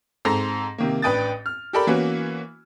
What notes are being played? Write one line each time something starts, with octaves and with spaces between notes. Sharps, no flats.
G#2 C4 A4 A#5 C6 A#6
C3 D#3 A#3
A1 D4 B4 G5 D#6 A6
F6
G4 A4 A#4 D5 B5
E3 A#3 B3 C#4 E4 F#4